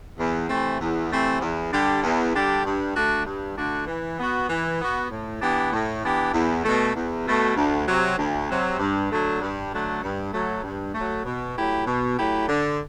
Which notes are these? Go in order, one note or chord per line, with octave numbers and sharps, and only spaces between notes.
E2
C3 E3 A3 C4
E2
C3 E3 A3 C4
E2
D3 G3 D4 G4
E2
D3 G3 D4 G4
G2
D3 A3 D4 F#4
G2
D3 A3 D4 F#4
E3
B3 F#4
E3
B3 F#4
A2
E3 B3 D4 G4
A2
E3 B3 D4 G4
E2
B2 A3
E2
B2 A3
D2
C3 F#3
D2
C3 F#3
G2
D3 F#3 A3 D4
G2
D3 F#3 A3 D4
G2
F#3 A3
G2
F#3 A3
B2
F#3 A3 E4 G4
B2
F#3 A3 E4 G4
D3